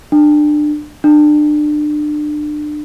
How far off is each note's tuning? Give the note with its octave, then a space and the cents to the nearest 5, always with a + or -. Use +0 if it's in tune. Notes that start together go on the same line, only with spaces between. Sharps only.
D4 +25
D4 +30